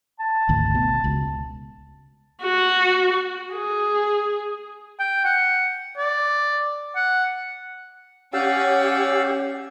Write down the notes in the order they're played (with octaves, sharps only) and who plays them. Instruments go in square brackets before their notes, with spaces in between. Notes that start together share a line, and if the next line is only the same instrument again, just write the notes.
[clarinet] A5
[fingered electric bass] G#1 D2
B2
C#2
[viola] F#4
G#4
[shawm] G5
F#5
D5
F#5
[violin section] C#4 [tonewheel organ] G4 [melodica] D5 F5 E6 [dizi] F#5